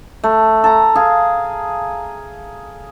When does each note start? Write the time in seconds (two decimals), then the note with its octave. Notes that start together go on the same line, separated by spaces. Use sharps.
0.24 A3
0.64 A4 A#5
0.95 G#4 F5